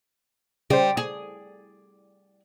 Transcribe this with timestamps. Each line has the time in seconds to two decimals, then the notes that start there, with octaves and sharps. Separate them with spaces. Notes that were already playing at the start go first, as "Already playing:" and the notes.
0.70 C#3 G3 C5
0.97 G#4